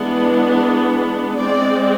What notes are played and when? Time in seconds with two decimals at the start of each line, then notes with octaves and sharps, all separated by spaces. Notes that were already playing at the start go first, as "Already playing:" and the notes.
Already playing: E3 G#3 B3 D4
1.36 G#3 C4 D5